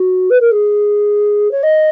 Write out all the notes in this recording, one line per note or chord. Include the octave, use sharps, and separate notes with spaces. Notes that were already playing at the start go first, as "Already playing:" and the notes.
Already playing: F#4
B4
A#4
G#4
C#5
D#5